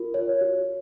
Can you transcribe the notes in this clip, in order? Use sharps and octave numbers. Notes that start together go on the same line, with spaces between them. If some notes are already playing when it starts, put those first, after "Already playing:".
Already playing: F4 A#4
C#5
F#4